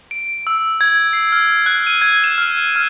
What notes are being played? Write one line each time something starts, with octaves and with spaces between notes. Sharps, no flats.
D7
E6
G#6
C7
F6
F#6
D#7
G#6
E7
F6
F6